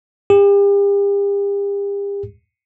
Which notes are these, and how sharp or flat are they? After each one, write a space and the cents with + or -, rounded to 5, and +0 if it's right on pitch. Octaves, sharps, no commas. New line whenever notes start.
G4 +40